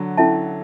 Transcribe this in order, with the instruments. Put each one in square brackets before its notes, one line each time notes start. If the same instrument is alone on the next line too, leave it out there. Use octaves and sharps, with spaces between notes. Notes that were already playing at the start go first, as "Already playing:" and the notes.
Already playing: [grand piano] D3 F#3
[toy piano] C#4 E4 A4 E5 A5